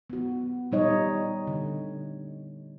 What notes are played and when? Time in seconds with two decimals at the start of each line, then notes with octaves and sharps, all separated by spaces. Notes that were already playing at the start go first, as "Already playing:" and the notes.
0.10 B3 F#4
0.71 A#2 G3 D#4 C#5 D#5
1.47 D3